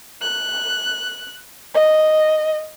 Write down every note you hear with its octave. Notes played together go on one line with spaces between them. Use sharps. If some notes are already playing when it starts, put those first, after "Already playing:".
F#6
D#5